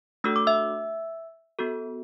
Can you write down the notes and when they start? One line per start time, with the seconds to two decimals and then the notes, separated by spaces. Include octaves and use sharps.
0.24 A3 D4 F#4 A4 E6
0.36 D6
0.47 E5 E6
1.59 B3 F#4 A4